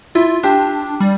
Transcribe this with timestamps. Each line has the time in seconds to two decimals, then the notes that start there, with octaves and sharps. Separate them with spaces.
0.15 E4 F4
0.43 D4 G4
1.00 G3